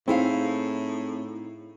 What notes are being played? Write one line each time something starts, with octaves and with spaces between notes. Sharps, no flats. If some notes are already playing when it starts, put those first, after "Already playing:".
A2 C4 D#4 E4 G#4 F5